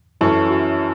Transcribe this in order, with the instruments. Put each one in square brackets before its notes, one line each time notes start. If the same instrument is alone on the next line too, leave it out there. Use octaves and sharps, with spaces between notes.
[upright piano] F#2 E3 C#4 A4 [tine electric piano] E4
[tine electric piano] F#4